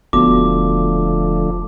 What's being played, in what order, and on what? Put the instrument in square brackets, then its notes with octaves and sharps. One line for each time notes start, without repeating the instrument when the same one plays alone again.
[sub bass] E1 [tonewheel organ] D3 F3 A3 [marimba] B3 F#4 [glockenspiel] D6